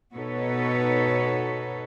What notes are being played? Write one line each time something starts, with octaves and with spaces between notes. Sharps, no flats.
B2 D#4 F#4 A4 B4 C#5